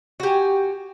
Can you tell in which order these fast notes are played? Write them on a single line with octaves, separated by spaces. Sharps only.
F#4 G4 G#5